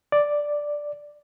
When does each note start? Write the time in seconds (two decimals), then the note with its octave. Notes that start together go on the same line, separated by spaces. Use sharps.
0.12 D5